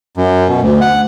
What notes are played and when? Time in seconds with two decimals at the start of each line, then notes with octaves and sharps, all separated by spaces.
0.17 F#2
0.48 B2
0.62 D2
0.81 F#5